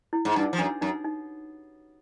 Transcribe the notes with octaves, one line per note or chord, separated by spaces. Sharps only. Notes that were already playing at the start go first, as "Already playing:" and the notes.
E4
G#2
G2 D#4
F3
F#2 D4
F#2 D#4
D#4